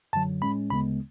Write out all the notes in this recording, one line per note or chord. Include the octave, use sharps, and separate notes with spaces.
F#2 D3 F#3 A5
A2 G#3 C#4 B5
D2 C#3 G#3 B3 B5